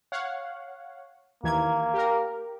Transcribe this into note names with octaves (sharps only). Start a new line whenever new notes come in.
C#5 F5 F#5
D#2 E3 A#3 G#6
G4 A#4